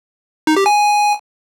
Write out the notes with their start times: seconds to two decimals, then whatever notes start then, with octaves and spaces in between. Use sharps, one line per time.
0.47 D#4
0.57 G4
0.66 G#5